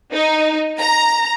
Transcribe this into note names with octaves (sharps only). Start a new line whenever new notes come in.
D#4
A#5